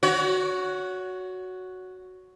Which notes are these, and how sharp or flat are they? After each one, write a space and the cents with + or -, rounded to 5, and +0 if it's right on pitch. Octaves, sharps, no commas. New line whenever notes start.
F#4 +0 C#5 +25